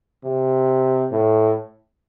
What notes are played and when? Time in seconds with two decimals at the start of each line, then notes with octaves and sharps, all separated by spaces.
0.24 C3
1.12 A2